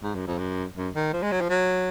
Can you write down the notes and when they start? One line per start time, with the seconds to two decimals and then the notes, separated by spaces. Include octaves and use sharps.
0.03 G#2
0.15 F#2
0.27 F2
0.38 F#2
0.77 F#2
0.95 D#3
1.13 F3
1.23 G#3
1.32 F#3
1.41 F3
1.50 F#3